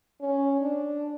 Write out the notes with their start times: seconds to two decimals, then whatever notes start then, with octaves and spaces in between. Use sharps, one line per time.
0.21 C#4
0.61 D4